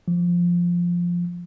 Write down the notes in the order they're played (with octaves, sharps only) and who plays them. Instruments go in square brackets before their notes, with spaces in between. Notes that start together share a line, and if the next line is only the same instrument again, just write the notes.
[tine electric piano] F3